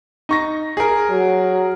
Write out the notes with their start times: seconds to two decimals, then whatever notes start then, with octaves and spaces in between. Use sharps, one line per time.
0.29 D#4 C#6 A#6
0.77 G#4 A#4
1.10 F#3